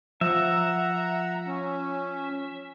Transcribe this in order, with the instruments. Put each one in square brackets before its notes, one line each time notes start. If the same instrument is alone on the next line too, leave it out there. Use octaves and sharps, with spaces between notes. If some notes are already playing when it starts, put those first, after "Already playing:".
[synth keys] F3 [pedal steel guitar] E5 [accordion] F#5 A#5
[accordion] C#4